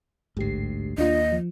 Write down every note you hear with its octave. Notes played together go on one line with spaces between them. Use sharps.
A1 D2 G#2 G4 C7
D#2 A#3 D4 F4 D#5
F3